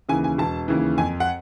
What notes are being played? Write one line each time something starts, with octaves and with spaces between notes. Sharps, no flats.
D#2 C#3 E3 G#5
G#5
E1 A5
D#2 C#3 E3
F2 G#5
F#5